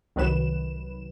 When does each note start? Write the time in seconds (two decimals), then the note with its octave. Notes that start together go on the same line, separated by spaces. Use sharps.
0.16 C2 D#3 F#3 B4 E7